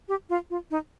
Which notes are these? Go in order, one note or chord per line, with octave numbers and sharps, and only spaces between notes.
G4
F4
F4
D#4